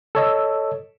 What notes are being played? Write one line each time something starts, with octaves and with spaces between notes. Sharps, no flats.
A4 C#5 D#5 E6